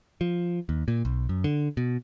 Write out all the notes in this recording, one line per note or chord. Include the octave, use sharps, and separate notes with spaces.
F3
D#2
A#2
B1
F#2
D3
B2